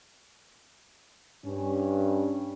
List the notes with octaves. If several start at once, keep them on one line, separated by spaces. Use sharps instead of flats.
G2 C#4